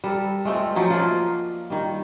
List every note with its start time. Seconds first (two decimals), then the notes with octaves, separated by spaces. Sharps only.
0.04 G3 A4 A#4
0.45 G#3 A3 C4 F4
0.75 F3 F#3 C#4 D#4
0.90 A#3 F4 D5 D#5
1.70 D#3 G3